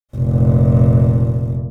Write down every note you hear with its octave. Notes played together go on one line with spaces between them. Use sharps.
F1 A#2